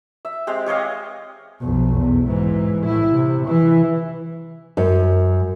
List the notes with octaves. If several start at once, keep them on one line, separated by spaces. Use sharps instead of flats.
E5
G#3 C4 G4
G4 C#5 D#5 F5
B1 F2
E2
G#2 E3
A2 E4
C3
E3 E4
F#2